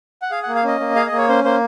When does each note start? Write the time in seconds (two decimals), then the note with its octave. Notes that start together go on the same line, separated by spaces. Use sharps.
0.22 F#5
0.31 G#4 F5
0.43 F#5
0.48 A#3
0.55 F5
0.64 C#4 D#5
0.80 A#3
0.95 G#4 F5
1.06 D#5
1.12 A#3
1.18 C#5
1.28 C#4 C5
1.44 A#3 C5